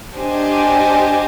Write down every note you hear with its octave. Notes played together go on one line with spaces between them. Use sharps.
D4 G4 C5 D#5 G#5